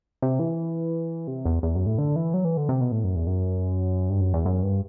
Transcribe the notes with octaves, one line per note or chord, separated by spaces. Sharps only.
C3
E3
C3
E2
E2
F#2
A2
D3
E3
F#3
E3
D3
C3
B2
A2
F#2
E2
F#2
G2
F#2
E2
F#2
G2